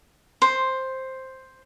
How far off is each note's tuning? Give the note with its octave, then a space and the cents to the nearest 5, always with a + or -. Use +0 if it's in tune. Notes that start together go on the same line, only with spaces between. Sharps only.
C5 +5